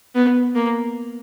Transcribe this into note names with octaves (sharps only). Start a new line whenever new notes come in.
B3
A#3